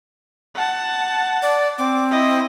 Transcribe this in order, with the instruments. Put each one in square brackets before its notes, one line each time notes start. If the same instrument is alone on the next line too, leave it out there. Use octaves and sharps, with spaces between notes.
[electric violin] F#5 A5
[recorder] D5
[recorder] C4 [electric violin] D6
[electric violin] E4 D#5